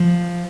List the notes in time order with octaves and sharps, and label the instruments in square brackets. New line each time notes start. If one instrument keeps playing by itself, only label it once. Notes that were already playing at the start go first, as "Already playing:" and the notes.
Already playing: [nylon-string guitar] F3